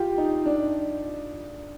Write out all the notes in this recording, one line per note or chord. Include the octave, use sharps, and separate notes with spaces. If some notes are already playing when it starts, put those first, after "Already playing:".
Already playing: F4 G4
D#4
D4